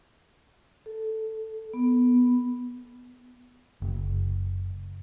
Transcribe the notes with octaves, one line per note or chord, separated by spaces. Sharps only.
A4
B3
F#1